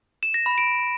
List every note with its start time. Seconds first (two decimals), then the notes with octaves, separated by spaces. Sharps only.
0.23 E7
0.34 A#6
0.46 B5
0.58 D7